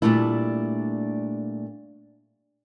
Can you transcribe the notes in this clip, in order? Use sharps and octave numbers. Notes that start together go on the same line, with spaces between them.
A#2 F3 G3 A3 D4 E4